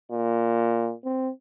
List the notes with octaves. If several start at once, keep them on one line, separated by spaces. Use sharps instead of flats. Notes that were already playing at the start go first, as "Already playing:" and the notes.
A#2
C4